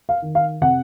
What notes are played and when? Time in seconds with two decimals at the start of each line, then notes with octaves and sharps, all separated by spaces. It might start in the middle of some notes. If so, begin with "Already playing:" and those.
0.09 F5
0.22 D#3
0.35 F5
0.61 C3 F#5